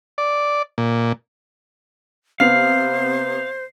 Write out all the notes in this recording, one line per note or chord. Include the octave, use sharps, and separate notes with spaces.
D5
A#2
C3 B3 C5 F5 C7 F7